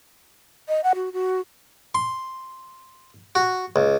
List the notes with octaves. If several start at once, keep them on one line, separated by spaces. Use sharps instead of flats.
D#5
F#5
F#4
F#4
C6
F#4
C#2